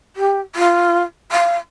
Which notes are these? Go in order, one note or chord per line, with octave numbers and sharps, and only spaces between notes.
G4
F4
F5